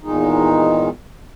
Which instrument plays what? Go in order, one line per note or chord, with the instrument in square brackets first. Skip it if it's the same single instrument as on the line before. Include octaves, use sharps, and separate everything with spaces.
[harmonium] E2 A#2 D#3 G#3 D#4